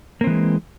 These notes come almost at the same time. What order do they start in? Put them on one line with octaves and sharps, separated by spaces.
A#3 C4 E3 G#3